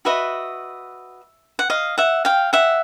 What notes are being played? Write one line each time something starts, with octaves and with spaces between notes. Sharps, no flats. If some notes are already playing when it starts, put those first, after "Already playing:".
F#4 B4 D#5 E5
F#5
D#5 F5
E5 F#5
F5 G5
E5 F#5